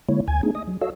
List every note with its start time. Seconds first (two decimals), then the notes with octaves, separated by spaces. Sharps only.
0.09 D3 G#3 A#3 E4 C#5
0.28 D2 G#5 G#6
0.43 A3 B3 D4 D#4 G#4
0.55 D#5 D#6
0.68 F#3
0.81 F#4 A4 C#5 D#5 F5 E6